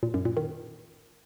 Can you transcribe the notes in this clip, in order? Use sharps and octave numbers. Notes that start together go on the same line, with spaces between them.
A#2
F#2
A#2
D#3